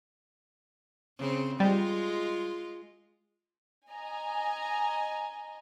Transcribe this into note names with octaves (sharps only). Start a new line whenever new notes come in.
C#3 C4
G3 G#3 F4
D#5 G#5 A#5